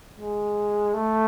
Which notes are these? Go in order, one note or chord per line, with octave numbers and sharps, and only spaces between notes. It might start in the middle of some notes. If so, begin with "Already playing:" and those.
G#3
A3